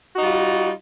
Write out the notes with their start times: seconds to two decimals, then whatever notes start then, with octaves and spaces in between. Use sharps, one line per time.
0.16 F#4
0.18 D#4
0.21 G3
0.24 F4